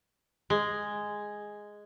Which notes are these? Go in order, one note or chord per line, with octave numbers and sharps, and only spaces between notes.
G#3